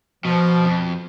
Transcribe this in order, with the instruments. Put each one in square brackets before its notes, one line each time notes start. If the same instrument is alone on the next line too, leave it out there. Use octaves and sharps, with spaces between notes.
[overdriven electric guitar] B2 [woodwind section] F3
[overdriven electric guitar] F2